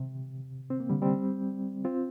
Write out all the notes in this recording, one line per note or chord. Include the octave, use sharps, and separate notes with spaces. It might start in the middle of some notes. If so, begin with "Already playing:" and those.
Already playing: C3
C4
A#3
D3 G3
G3 C4
C4 F4